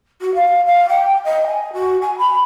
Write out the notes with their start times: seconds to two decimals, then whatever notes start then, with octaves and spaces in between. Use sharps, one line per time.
0.21 F#4
0.35 F5
0.67 F5
0.89 G5
1.25 D#5
1.47 G#5
1.73 F#4
2.02 G#5
2.18 B5